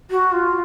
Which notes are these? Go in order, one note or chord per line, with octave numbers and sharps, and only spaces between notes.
F#4
F4